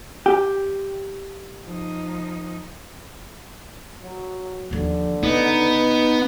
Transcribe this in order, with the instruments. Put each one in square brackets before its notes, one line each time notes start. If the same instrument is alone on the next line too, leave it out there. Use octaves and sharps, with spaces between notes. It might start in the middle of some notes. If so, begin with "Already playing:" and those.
[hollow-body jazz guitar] G4
[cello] F3 D#4
[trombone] F#3
[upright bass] D#2 F3 [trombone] D3
[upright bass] C#3 [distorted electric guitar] B3 [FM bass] D#4